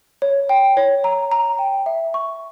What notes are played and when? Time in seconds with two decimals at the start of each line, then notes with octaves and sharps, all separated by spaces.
0.22 C#5
0.49 G5
0.77 C#5
1.04 A#5
1.32 A#5
1.59 G5
1.86 E5
2.14 C#6